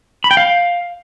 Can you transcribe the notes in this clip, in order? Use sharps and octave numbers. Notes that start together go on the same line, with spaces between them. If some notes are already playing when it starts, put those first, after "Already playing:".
B5
G5
F5